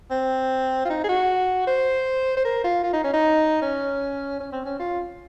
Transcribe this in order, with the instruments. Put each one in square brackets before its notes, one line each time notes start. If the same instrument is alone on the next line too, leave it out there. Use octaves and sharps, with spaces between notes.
[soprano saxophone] C4
F4
D#4
G#4
F#4
C5
C5
A#4
F4
F4
D#4
C#4
D#4
C#4
C#4
C4
C#4
F4